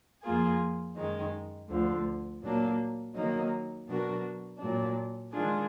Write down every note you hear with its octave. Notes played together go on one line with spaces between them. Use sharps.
F2 F3 A#3 F4 G#4
F#2 D#3 G#3 D#4
D2 D3 F3
A#2 F#3 A#3 D4
D#3 F#3 A#3 D#4
B2 F#3 D4 F#4 A#4
A#2 F#3 D4
D#3 G#3 D4 F4 G#4